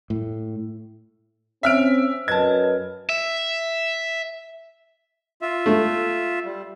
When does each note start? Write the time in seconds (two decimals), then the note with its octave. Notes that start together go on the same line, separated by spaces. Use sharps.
0.10 A2
1.63 C4 C#4 E5 F6 D7
2.28 F#2 B4 D#5 A5 G#6
3.09 E5
5.41 F4 E5
5.66 A3 A4
6.45 G3